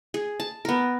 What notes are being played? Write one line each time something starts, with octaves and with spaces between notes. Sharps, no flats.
G#4
A5
B3 A#4